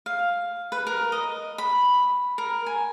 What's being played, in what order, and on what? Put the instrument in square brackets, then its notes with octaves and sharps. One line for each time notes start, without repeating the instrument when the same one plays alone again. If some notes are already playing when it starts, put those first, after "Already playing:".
[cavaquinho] F5
B4
A#4
D#5
B5
A#4
G#5